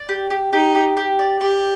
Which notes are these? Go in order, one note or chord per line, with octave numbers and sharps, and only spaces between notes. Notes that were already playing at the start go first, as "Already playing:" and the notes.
Already playing: D5
G4
G4
D#4 G4
G4
G4
D5
G4 D5